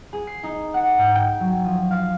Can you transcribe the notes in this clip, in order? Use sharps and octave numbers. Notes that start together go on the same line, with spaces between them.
G#4
C7
D#4
F#5
G#2
G5
F#3
F3
F5